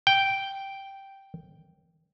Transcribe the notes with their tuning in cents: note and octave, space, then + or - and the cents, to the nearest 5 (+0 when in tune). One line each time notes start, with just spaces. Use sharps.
G5 -5